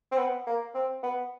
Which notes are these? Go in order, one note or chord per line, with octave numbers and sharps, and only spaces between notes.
C4
B3
A#3
C4
B3